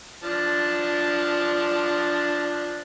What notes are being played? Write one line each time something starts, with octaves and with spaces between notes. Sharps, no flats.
F3 D4 A5